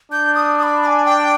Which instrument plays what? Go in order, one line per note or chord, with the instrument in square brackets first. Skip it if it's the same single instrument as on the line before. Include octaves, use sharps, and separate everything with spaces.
[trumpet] D4 [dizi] G6
[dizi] D#6
D#6
B5
B5
G#5
G5